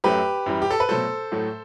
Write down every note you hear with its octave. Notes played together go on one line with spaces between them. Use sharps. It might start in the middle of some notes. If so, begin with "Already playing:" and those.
F#2 F#3 A3 G4 B4
F#2 E3 G3
G4
A4
B4
B2 F#3 A3 A4 C5
A2 F#3 A3